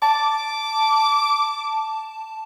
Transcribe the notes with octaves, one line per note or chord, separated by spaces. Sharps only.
A5 D6